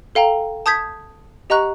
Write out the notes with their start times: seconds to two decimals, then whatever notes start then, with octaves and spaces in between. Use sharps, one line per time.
0.15 A4 F5 G5 A#5
0.66 A5 D#6 G6 G#6 B6
1.50 G4 D#5 F#5 A#5 C#6 F#6